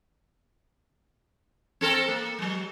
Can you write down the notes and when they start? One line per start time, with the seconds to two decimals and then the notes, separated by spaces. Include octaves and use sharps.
1.81 C4 A4 A#4
2.08 A#3
2.39 F#3 G#3